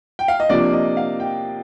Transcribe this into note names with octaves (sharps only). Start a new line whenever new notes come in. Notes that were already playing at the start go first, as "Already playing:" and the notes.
G5
F5
D#5
C3 F3 A#3 D4 D5
D#5
F5
G5